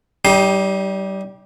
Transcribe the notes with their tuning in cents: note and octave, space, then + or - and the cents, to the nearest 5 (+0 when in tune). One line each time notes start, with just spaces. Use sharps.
G3 -30 D#4 +25 G4 +0